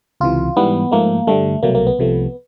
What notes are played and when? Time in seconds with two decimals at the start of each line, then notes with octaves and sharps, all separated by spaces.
0.20 C#2 C3 E3 F4
0.56 G#2 E3 G3 B3
0.91 G#2 F3 A3 A#3
1.27 G2 D3 G3 A3
1.63 C2 B2 F#3 A3 A#3
1.75 A#3
1.87 B3
1.99 C2 C3 F3 A3